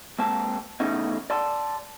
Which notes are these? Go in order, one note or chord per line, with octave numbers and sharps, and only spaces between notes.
G#3 A#3 C4 A5
E2 A2 C#3 A3 C#4 D#4
D5 A5 C6